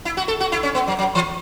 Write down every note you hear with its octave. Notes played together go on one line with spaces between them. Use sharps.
E4
F#4
A4
F#4
E4
C#4
B3
F#3
F#3
E3